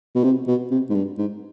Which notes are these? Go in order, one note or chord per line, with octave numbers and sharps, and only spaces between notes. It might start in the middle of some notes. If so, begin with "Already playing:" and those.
B2
C3
B2
C3
G#2
G2
G#2